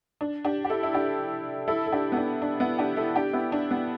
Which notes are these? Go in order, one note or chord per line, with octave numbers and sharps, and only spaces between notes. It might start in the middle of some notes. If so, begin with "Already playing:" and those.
D4
D4 G4
G4
E4 A4
E4
D4 G4
E4 A4
A4
D4 G4
B3
D4
D4
B3 E4
D4 G4
E4 A4
D4 G4
B3 E4
D4
B3